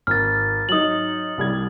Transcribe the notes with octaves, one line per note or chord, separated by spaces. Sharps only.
G#1 F6 A6
F#3 D#4 D#6 F#7
C2 G3 G#6